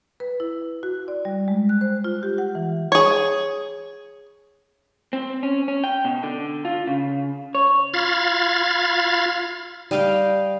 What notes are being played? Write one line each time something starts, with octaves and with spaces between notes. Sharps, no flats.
B4
E4
F#4
D5
G3
G#3
F#6
C5
F4
G4
F#5
E3
G#4 C#5
C4
C#4
C#4
G5
B2
D3
F4
C#3
C#5
F4 F5 B5 F6 G#6 A6
G3 D#5 F5 G5